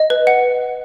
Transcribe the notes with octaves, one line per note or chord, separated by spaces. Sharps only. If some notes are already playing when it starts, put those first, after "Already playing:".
Already playing: D#5
B4
F#5